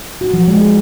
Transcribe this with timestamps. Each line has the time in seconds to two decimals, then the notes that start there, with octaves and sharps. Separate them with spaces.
0.21 F#4
0.34 F3
0.48 G#3
0.61 G#4